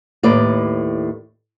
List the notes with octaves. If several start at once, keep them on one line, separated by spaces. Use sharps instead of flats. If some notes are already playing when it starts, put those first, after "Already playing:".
D#2 A2 B4 D5